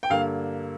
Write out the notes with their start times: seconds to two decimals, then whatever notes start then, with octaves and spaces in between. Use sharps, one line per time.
0.03 G5
0.10 G2 D3 A#3 F5